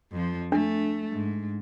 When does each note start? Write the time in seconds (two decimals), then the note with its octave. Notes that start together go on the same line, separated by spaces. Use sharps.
0.12 F2 F3
0.52 A3 D4
1.12 G#2